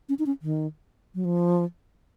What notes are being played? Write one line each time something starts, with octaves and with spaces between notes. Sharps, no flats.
C#4
D#4
C#4
D#3
F#3
F3